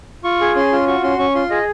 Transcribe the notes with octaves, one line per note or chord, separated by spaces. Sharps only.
F4 C#6
G#4
C#4 C6
F4
F#4 C#6
C#4 C6
C#4 C#6
F4 C6
G#4 D#5